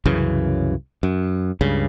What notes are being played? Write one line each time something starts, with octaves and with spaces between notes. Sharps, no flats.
C2 F#2 C#3 E3
F#2
C#2 G2 C#3